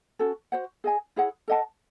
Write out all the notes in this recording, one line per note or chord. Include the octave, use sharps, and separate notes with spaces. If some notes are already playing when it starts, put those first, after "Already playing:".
C#4 F#4 A4
F#4 C5 F#5
G#4 D#5 G#5
E4 G#4 C#5 F#5
A4 D#5 F#5 A5